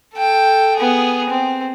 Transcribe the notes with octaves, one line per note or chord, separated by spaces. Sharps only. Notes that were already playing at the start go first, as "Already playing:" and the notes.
A4 G5
B3 G#4
C4